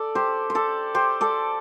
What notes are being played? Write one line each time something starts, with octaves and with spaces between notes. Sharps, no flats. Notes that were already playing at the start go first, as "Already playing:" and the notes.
Already playing: A4 D5
G4 C5
C5
A4 D5
G4 C5
A4 D5